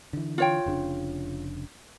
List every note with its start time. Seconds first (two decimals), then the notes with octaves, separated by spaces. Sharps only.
0.13 D3 E3
0.38 F4 C#5 G5
0.66 F1 C#3 D4